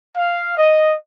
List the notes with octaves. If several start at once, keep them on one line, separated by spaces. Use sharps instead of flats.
F5
D#5